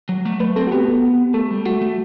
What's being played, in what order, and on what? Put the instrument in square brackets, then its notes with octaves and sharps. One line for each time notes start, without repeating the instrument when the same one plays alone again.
[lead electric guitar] F#3
A3
[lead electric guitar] A3 [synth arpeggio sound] B4
[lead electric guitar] C4 [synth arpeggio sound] A4
[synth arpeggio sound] F#4
[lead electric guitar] B3 [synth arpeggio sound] G4
[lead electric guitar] A3 [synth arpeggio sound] A4
[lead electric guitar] G3
[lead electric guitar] A3 [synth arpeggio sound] F#4
[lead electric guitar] A3